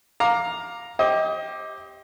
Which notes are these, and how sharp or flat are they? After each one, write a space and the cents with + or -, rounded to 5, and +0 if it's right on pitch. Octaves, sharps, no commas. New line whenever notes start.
F5 +20 A#5 +0 D6 +0
G4 +0 C5 +35 D#5 +25